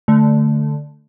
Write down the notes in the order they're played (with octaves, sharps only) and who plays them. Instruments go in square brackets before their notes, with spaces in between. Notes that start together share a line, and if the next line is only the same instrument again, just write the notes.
[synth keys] D3 A3